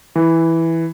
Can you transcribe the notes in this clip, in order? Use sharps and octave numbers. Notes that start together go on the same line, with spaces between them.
E3